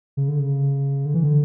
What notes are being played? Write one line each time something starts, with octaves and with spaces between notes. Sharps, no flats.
C#3
D3
C#3
D3
E3
D3